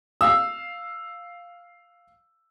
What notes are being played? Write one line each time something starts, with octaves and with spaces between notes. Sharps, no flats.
F5 E6